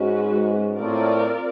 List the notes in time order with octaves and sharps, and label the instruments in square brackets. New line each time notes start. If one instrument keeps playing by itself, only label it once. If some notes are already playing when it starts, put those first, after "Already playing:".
Already playing: [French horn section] G#2 [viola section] G#3 C#4 F#4 B4
[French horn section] A2 [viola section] C4 F4 A#4 D5